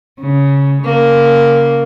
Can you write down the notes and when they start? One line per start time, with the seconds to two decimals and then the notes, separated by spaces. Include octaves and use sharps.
0.22 C#3
0.84 C#3 A#3